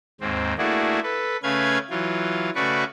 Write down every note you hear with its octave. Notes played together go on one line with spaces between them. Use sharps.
D#2 G#2 C4
A3 A#3 D4 E4 F#4 G#4
A4 B4
C#3 A3 C#4 B4 F5 G#6
E3 F#3 F4
C#3 A3 F#4 B4 D5 C#6